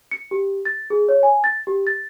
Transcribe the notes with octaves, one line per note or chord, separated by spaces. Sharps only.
C#7
G4
A6
G#4
C#5
G#5
A6
G4
A6